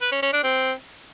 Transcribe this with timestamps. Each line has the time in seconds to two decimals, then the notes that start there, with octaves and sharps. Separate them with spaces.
0.02 B4
0.12 C#4
0.23 C#4
0.33 D4
0.44 C4